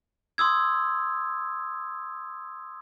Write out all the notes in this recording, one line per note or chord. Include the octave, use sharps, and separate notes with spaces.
C6 D#6 E6 G#6